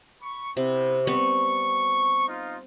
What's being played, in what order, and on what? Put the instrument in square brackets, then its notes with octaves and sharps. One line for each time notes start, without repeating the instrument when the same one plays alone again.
[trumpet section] B5 C#6
[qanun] C3 [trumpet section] B3 C4 E4
[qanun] G3 B3 C4 [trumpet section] C#6
[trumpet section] D#4 F4